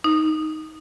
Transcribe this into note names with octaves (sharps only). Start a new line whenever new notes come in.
D#4